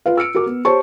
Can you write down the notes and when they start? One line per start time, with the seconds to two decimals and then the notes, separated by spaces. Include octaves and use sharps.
0.06 F4 B4 F5
0.17 E6 F6 C#7 D7
0.35 F#4 A#4 D6
0.46 B3
0.65 G4 C5 C#5 A5 C#6